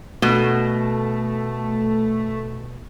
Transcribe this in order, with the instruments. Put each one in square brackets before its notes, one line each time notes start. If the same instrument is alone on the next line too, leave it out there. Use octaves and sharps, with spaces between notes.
[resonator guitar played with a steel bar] B2 [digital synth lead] A3